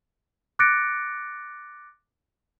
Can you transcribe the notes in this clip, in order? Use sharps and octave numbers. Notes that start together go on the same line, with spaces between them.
D6 F#6 A6 A#6 C#7 D7